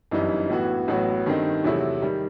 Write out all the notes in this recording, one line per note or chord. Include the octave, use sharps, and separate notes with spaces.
G1 F#2 E3 G3 D#4
A2 E3 B3 F#4
A1 A2 F#3 B3 F#4
G2 D#3 A3 C4 D#4
E2 C3 F#3 A3 E4
D#3 G3